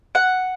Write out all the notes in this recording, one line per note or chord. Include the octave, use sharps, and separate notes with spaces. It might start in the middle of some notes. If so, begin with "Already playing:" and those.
F#5